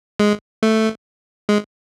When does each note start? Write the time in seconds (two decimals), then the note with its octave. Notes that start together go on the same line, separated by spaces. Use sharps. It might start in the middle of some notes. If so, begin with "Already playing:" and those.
0.19 G#3
0.63 A3
1.49 G#3